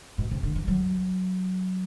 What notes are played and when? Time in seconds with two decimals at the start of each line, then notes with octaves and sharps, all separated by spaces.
0.18 B2
0.31 C3
0.43 D3
0.56 E3
0.68 F#3